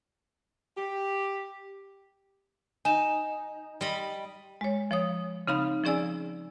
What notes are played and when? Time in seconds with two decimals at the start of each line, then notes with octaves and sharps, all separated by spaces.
0.77 G4
2.85 D#4 G#5 E7
3.81 G3 D#5 B5
4.61 G#3 C#5
4.91 F3 C#5 D#6
5.48 C#3 C4 D#4 F5 B5 F6
5.84 F3 C#4 G#4 D5 G#5 E6